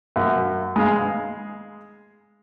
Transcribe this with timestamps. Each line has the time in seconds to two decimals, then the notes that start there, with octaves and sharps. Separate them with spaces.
0.16 F#2
0.76 G#3 F5